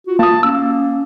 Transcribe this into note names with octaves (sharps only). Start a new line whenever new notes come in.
F4 F#4
A#3 A5 D#6
A#3 C#4 E6